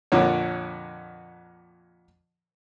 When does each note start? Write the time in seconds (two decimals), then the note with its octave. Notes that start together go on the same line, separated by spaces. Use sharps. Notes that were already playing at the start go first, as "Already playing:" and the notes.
0.12 F2 A#2 D3 C#5